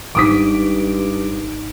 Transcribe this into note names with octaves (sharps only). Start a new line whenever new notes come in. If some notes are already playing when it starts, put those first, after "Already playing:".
G#1 G2 D#4 D6 D#6 B6 D7